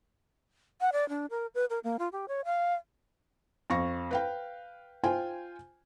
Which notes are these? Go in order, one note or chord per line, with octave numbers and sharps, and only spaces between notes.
F#5
D5
D4
A#4
B4
A#4
A#3
F4
G4
C#5
F5
F2 F5 C#6 A#6
B4 F5 G5
F4 C5 G5 G#5